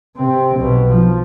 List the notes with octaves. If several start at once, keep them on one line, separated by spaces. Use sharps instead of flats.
C3 C4
B1 B2
F3